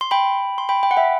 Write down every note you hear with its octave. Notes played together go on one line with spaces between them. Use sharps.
C6
G5 B5
C6
G5 B5
G5 B5
F#5
E5 G5